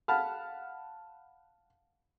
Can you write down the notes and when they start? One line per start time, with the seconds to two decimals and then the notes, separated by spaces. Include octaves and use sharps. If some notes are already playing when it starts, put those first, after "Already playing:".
0.08 F5 F#5 A5 B5 F6